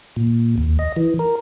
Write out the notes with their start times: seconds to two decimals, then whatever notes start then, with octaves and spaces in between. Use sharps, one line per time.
0.16 A#2
0.58 D#2
0.79 D#5
0.96 E3
1.19 A#4